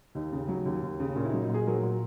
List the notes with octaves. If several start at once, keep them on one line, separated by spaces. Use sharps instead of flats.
D#2 D#4
C#3
F#3
D#2
D#2
C#3
A#2 C#4
E4
D#4
F#3
D#4
A#2 G#4
F#3 A#4
A#2